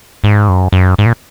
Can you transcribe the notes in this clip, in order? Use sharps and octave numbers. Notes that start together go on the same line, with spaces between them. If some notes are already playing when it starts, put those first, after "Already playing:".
G#2
F#2
F#2
G#2
A#2